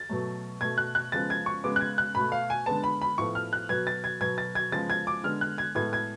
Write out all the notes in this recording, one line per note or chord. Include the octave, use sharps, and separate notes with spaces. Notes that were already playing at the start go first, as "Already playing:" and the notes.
Already playing: A6
B2 F#3 A3
B2 A3 G#6
F#6
F#6
C#3 F3 G#3 B3 A6
G#6
C#6
C#3 G#3 B3 D6
F#6
G#6
F#6
B2 A3 B5
F5
G#5
D3 G#3 B3 A5
B5
B5
A2 F3 B3 C#6
F6
F#6
B2 F#3 B3 G#6
A6
G#6
B2 F#3 B3 G#6
A6
G#6
C#3 F3 G#3 B3 A6
G#6
D6
D3 G#3 B3 F6
F#6
G#6
A2 G#3 B3 G#6
G#6